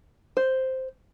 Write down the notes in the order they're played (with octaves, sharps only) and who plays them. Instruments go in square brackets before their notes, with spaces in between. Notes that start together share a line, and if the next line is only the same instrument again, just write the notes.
[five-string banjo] C5